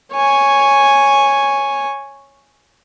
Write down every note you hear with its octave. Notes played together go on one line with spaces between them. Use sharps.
C#5 G#5